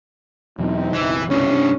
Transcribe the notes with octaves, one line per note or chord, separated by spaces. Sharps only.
E2 B2 F#3 C4 D#4 E4
F#1 B1 E3
C2 G2 C#4 D4